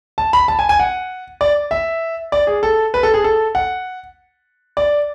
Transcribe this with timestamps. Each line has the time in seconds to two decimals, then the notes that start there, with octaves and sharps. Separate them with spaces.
0.18 A5
0.33 B5
0.48 A5
0.59 G#5
0.69 G#5
0.79 F#5
1.41 D5
1.71 E5
2.32 D5
2.47 G#4
2.63 A4
2.94 B4
3.03 A4
3.14 G#4
3.24 A4
3.55 F#5
4.77 D5